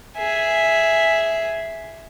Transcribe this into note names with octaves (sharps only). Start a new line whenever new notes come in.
G#4 E5